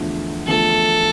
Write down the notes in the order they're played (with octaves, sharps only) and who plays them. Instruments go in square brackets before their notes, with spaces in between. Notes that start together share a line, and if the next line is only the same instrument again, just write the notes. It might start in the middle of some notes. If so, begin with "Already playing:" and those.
Already playing: [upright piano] E2 D3 F3 A3
[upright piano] E2 D3 F3 A3 [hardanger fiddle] A4